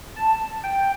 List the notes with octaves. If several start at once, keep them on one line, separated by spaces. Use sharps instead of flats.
A5
G5